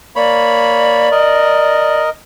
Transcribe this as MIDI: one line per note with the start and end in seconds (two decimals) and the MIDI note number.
0.16 1.09 58
0.16 1.09 73
0.16 2.00 74
0.16 1.09 83
1.11 2.10 70
1.11 2.10 75